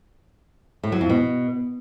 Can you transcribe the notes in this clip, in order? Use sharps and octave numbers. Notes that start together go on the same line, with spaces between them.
A2
F#3
F2
B2